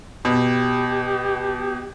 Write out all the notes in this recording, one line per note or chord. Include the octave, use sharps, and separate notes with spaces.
B2 G4